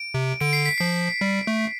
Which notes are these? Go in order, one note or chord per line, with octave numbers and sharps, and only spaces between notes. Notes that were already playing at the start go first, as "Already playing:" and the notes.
Already playing: D7
C3
D3 D7
C7
B6
F3 C7
G3
A3